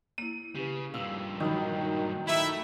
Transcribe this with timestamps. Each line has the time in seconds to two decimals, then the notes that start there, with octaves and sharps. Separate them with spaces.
0.18 A#3 E4 D#7
0.55 C#3 G4 B4
0.94 G2 A#2 F5 E6
1.40 D#3 F#3 B5 D#6
1.85 A#4
2.27 A3 E4 D#5 E5 A#5 B5